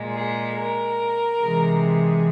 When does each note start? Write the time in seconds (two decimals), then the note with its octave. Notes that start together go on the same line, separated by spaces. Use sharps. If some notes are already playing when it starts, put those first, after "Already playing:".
Already playing: A#2 G#3
0.14 G#4
0.56 A#4
1.39 C3 E3 G#3